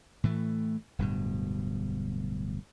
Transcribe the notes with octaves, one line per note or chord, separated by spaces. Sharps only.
A2 E3 A3
D1 G2 B2